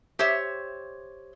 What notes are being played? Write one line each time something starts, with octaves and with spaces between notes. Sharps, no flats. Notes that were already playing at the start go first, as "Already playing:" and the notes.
G4 C5 C#5 E5